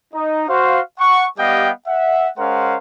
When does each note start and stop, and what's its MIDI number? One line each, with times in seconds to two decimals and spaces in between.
0.14 0.44 63
0.48 0.80 66
0.48 0.80 72
0.48 0.80 77
0.99 1.26 78
0.99 1.26 85
1.38 1.71 55
1.38 1.71 59
1.38 1.71 67
1.38 1.71 75
1.38 1.71 77
1.38 1.71 79
1.87 2.29 76
1.87 2.29 78
2.38 2.77 56
2.38 2.77 61
2.38 2.77 70
2.38 2.77 72
2.38 2.77 77
2.38 2.77 78